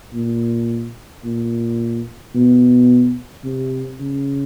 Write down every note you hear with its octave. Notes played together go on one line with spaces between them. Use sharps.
A#2
A#2
B2
C3
C#3